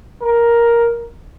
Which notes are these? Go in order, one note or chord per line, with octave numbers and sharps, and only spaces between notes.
A#4